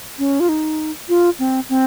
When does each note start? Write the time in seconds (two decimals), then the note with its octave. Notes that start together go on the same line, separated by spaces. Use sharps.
0.19 C#4
0.40 F4
0.49 D#4
1.09 F4
1.39 C4
1.69 C4